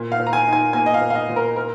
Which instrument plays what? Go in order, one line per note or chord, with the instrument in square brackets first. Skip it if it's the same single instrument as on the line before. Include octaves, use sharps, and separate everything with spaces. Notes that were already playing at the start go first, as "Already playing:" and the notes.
Already playing: [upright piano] A#2
F5
A#2
A#5
G#5
D#4
G#5
A#3 G#5
D#5
F5
A#2
F5
D#5
A#2
A#4
A#4